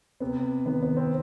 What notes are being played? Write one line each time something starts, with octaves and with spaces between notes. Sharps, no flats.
C3 B3
D#3 B3
B3
C4